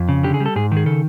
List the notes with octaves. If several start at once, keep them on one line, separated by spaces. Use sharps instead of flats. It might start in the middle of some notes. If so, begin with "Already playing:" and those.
Already playing: F2
C#3
D3 G4
G#4
G3
A4
G#2 G#4
D#3
G#4
C#3 A4